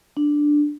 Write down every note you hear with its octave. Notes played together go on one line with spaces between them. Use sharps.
D4